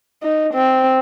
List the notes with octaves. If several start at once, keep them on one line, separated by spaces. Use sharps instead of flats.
D#4
C4